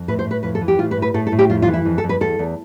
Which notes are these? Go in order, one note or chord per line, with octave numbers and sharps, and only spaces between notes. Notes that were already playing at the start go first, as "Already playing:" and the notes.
Already playing: F2
A2 B4
C5
A2
B4
F2 B4
A4
E3
G4
A2 F4
B4
A2
B4
A2 A4
A4
A2
G4
F2 F4
F4
E3
E4
F2
A4
F2
B4
E2 A4
E2